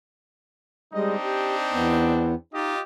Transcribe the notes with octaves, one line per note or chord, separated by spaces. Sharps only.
G3 G#3 C4 D4 D#4 D#5
G4
E2 B3
D#4 F4 G4 D#5